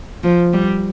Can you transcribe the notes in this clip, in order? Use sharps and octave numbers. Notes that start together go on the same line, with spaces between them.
F3
G3